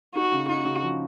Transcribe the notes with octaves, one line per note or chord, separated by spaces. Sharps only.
D#4 F#4
C#3
D#4 F#4
C#3
F3